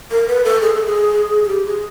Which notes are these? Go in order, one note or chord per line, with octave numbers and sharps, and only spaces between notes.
A#4
B4
A4
G#4
A4
G#4
G#4
G4
G#4